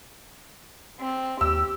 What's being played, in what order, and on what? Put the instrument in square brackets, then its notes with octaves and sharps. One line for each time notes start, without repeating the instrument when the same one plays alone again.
[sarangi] C4
[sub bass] D#2 [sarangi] G4 [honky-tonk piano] E6